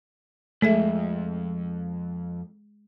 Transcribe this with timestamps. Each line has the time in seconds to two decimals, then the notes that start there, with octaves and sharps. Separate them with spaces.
0.62 C2 F2 G#3 A3 G#4 E5